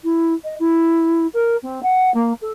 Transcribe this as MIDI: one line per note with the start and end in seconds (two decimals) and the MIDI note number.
0.03 0.32 64
0.43 0.54 75
0.59 1.26 64
1.33 1.55 70
1.62 1.82 60
1.82 2.12 78
2.14 2.32 58
2.41 2.51 69